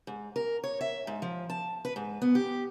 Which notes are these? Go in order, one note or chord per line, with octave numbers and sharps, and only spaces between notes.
G#2
A#4
C#5
E5
G#2
F3
A5
B4
G#2
B3
G4